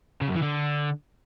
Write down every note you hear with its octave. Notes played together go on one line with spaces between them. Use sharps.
C#3
F#2
E3
D3